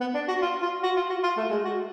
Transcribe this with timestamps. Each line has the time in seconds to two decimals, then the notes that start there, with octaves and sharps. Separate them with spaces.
0.01 B3
0.15 D4
0.28 F#4
0.42 F4
0.62 F4
0.83 F#4
0.97 F4
1.10 F#4
1.23 F4
1.38 A3
1.51 G#3
1.65 F#4